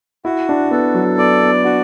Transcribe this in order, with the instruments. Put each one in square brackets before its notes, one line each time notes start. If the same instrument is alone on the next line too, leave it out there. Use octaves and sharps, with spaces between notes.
[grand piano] E4 [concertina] F#4
[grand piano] D4
[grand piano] B3 [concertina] A4
[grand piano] F#3
[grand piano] B3 [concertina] D5
[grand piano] B3
[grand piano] D4 [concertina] F#4